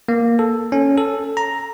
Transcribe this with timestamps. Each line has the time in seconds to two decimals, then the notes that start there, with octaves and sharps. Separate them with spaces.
0.08 A#3
0.39 A4
0.72 C#4
0.97 A4
1.37 A#5